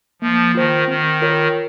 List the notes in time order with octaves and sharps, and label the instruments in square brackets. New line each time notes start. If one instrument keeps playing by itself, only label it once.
[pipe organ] F3 [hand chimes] A#3
[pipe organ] D#3 [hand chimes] F4 C5
[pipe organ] D#3 [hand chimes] C4
[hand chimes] F4 A#4 C#5